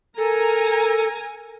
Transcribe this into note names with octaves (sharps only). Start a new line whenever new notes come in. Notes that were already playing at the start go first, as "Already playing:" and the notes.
A4 A#4 G#5 A#5